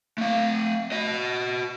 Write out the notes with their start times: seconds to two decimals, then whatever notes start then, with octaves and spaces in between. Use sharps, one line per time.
0.18 A3 F5
0.92 F#4 D#5